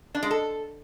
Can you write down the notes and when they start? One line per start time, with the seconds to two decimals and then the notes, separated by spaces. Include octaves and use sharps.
0.15 D4
0.23 G#3
0.31 A4